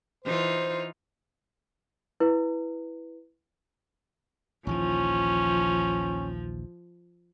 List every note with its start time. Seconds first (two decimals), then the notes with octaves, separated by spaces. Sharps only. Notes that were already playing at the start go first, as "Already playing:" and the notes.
0.24 E3 D#4 F4 C5
2.20 E4 B4
4.67 A#1 D#2 E3 F3 C#4